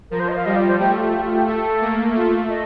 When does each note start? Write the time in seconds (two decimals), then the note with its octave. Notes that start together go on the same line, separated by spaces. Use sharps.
0.11 F3 A#4
0.20 C5
0.29 D#5
0.36 F5
0.46 G3 D#5
0.56 D5
0.68 C5
0.79 A3 G4
0.97 F4
1.13 G4
1.24 F4
1.35 G4
1.47 A3 A4
1.81 A#3
2.15 A3 F4
2.49 D#5